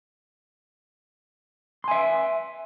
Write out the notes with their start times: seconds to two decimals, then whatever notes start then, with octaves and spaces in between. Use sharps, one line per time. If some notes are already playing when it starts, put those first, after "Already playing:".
1.84 C6
1.88 G#5
1.91 E5